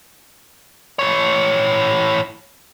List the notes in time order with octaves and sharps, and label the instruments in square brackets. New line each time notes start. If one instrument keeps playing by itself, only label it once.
[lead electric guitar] E3 C#5